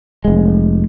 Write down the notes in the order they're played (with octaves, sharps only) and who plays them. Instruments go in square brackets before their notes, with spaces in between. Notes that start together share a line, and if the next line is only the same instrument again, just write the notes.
[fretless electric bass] F1 G#3